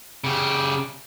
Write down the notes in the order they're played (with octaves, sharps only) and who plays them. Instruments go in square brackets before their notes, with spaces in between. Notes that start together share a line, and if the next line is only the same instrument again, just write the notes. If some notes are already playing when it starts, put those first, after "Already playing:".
[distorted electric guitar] C#3 G4